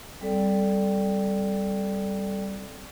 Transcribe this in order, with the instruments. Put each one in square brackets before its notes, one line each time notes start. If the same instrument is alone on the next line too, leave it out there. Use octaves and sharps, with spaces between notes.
[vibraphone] G3 C4 A4 D5 G5